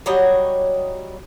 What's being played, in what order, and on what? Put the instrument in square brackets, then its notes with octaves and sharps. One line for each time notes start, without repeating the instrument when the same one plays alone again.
[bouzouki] F#3 G3 C#5 D#5